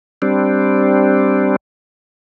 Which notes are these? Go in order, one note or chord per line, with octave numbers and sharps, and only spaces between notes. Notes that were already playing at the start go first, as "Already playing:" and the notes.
G3 C4 D4